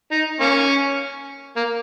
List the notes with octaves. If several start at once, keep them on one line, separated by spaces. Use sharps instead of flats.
D#4
A#3 C#4
A#3